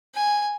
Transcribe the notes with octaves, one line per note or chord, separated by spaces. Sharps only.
G#5